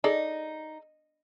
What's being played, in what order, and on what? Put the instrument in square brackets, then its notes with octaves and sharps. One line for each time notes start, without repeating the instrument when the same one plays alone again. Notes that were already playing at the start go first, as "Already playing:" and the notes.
[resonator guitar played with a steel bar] D#4 [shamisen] G#4 A4 D5